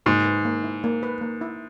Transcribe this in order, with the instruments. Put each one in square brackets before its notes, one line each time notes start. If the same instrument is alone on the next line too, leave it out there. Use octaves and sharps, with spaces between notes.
[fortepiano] G#2 [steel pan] A#3
[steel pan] B4
A#3
E4
A#3
B4
A#3
E4